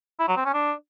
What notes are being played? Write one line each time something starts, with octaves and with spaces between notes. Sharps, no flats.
E4
F#3
C4
C#4
D4